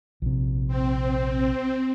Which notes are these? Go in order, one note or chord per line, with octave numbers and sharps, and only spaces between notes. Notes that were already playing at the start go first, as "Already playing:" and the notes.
A#1 C3
C4